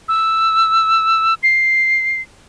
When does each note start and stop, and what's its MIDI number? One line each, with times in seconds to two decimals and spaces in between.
0.09 1.34 88
1.43 2.21 96